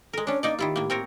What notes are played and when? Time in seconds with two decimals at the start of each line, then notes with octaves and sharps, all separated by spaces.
0.13 G#3 A4 A#4
0.27 C#4 D4 C#5
0.43 A#3 D#4 D5 D#5
0.59 D#3 E4 F4 G4
0.76 A2 A#3
0.90 C4 A#4 C#5